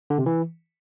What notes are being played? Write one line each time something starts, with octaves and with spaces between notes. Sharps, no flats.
D3
C3
E3